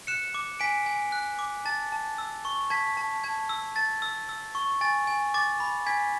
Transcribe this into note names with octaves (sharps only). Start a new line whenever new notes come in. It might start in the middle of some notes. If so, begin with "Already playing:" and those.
F#6 C#7 E7
D6
G#5 B6 D7
G#5
F#6
D6
A5 A6
A5
E6
C#6
A5 G#6 B6
A5
A5 G#6
E6
A5 A6
E6
E6
C#6
G#5 A6
G#5
D6 A6
B5
G#5 G#6 B6